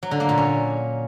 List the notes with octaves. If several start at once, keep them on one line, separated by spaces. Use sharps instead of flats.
F#3
D3
A#3
A#2
C#4